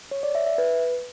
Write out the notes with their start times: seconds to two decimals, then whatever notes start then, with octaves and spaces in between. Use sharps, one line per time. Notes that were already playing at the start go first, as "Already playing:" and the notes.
0.11 C#5
0.23 D5
0.35 E5
0.47 E5
0.58 B4